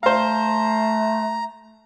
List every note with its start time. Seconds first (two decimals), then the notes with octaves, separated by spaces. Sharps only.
0.03 A3 C5 F5 A#5